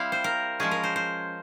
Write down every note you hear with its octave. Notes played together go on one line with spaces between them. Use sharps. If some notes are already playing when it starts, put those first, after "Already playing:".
Already playing: G3 C4 E4 F5
C5
A#4
F3 G#3 C#4 G#4
A#4
C5
C5